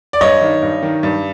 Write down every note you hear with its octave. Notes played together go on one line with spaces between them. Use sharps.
D5
G2 C#5 D#5
D#3
G2
D#3
G2